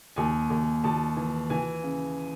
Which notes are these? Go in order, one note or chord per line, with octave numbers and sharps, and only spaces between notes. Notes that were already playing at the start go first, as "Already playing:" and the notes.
D#2 G#5
D#2
D#2 A5
E3
E3 G#5
C#3